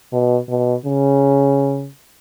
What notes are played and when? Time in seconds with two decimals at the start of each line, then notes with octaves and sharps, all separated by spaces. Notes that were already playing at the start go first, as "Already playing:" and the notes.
0.13 B2
0.49 B2
0.86 C#3